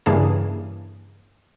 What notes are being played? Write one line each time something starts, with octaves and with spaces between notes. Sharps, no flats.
G2 C#3 E3 A#3 G#4 A5